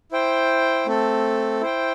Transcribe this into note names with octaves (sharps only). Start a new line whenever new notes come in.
E4 C5 G5
A3 C4 A4
E4 C5 G5